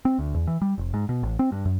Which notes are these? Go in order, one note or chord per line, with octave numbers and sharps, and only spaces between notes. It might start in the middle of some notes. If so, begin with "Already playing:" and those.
C4
D2
E2
E3
G3
F1
G#2
B2
A1
C4
G2
F#2